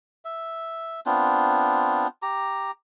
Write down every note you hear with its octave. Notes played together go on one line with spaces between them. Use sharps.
E5
B3 C4 D4 F4
G4 A#5